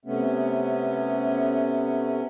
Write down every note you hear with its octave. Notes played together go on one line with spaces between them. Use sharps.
C3 A3 B3 C#4